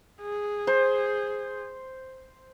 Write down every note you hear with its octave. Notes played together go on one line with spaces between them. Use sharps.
G#4
C5